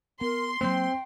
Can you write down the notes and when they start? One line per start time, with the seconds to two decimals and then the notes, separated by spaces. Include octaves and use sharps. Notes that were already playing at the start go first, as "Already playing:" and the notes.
0.21 B3 A#4 C6
0.61 F#3 G3 A#3 C4 C5 G5